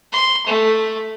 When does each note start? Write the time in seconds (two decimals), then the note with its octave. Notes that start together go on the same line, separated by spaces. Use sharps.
0.13 C6
0.47 A3